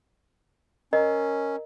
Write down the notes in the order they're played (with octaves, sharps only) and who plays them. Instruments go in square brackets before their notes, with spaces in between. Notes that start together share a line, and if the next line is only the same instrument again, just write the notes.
[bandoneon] C#4 [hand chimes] A#4 [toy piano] D#5